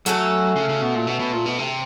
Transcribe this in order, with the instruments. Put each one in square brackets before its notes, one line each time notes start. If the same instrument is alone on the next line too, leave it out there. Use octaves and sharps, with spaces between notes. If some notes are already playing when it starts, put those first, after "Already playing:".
[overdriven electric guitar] F#3 [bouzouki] A3 C#4 F#4 A4
[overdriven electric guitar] C#3
C#3
B2
A#2
B2
B2
A#2
B2
C3